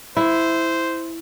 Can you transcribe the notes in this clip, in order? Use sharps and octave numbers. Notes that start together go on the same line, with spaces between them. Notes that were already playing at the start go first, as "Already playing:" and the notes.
E4 C5